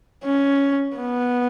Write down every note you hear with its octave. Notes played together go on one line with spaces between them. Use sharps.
C#4
B3